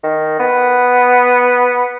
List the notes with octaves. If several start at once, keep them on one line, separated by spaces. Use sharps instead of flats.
D#3
B3